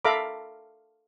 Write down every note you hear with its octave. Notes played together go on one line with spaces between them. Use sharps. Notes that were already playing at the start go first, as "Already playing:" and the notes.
A4 E5 F5 A#5 B5 D6